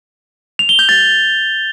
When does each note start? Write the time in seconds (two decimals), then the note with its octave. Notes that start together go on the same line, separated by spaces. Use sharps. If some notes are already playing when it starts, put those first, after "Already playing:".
0.59 F7
0.69 G7
0.79 G6
0.89 A6